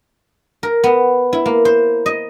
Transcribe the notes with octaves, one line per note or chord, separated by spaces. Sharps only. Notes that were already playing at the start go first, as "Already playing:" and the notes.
A#4
B3
E4
A#3
C5
D#5